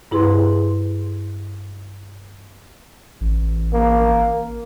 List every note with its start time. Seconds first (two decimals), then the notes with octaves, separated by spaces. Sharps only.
0.11 G2 E4 G#4 B4 C6
3.21 A1
3.73 A#3